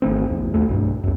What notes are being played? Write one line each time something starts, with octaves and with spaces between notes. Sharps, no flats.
G#1 D#3 A3 C4
A#1 E2
D#2 A3
B1 G2
C2 F#2